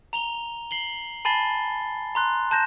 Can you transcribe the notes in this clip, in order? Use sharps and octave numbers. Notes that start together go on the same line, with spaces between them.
A#5 F7 G7
C7 F#7 G7
G#5 A5 B5 A6 C7 G7
A#5 C6 F#6
A5 F#6 G6 A#6 E7